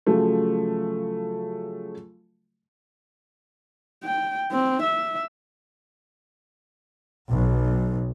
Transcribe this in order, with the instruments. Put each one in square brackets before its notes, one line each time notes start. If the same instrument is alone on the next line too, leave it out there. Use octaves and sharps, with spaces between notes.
[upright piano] C#3 F3 F#3 A3
[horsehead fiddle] G5
C4
E5
[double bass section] B1